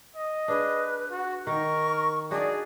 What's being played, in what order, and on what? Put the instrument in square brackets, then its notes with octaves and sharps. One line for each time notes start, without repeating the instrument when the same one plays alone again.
[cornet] D#5
[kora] D4 G#4 [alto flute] B4
[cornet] F#4
[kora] D#3 [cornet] A#4 [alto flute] C#6
[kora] D4 D#4 F#4 [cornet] G#4 [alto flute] D5